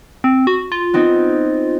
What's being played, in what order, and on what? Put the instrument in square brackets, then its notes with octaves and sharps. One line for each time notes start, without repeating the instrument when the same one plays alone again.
[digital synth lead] C4
F#4
F4
[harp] B3 C4 D#4